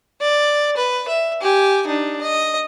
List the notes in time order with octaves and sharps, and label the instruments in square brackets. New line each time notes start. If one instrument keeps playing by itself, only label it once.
[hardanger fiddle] D5
B4
E5
G4 G#5
D4 D#4
D#5